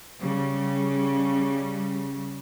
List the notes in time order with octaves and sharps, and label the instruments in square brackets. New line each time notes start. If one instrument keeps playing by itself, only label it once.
[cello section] C#3 G3